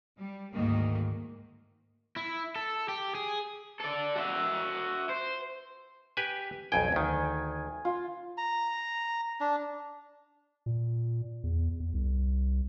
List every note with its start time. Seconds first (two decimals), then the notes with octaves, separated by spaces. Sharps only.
0.17 G3
0.53 D2 G#2 D#3 A#3
2.16 E4
2.56 A4
2.89 G4
3.15 G#4
3.80 A4 D5
4.15 F#4 E5
5.09 C5
6.17 G4 B4 G#5
6.72 B1 F2 G5 G#5
6.92 D2 D#3
7.85 F4
8.38 A#5
9.41 D4
10.66 A#2
11.44 E2
11.80 E2
11.94 C2